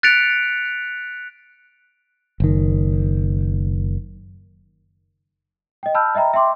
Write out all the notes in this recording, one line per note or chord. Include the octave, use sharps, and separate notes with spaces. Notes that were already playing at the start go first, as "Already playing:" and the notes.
F#6 A6 B6 C#7 D7 F7
F#1 D#3
D#5 G5
A5 B5 E6 F6 G6
D#5 E5 G5 A#5 B5
E5 G5 C6 D6